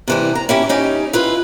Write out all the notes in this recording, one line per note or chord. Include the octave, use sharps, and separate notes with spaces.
C3 E3 G3
A#5
C#4 E4 G4
C#4 D#4 G4
E4 F4 B4